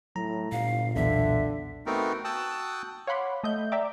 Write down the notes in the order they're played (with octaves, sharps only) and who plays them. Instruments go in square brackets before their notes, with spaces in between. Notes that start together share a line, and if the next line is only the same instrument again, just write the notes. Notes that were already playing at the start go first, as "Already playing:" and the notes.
[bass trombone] A2 [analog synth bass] F#3 [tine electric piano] A#5
[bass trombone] G1 [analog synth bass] A#2 [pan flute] F5
[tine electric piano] B1 E2 [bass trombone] D3 [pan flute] E5
[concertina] A3 B3 C4 D#4 F#4 A#4
F#4 G5 A5 D#6 E6 F#6
[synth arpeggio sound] C#5 F5 F#5 B5 C6 D6
A3 D#5 E5 G6
D5 E5 G5 A#5 D6